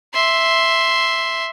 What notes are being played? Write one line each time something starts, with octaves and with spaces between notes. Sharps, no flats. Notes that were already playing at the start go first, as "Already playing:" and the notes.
E5 C6